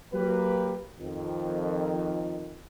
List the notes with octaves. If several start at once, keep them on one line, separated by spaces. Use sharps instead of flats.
F#3 A#3 G4 B4
F2 D#3